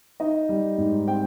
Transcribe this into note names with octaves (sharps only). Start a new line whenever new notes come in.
D#4 D#5
G3
G#2
C4 G5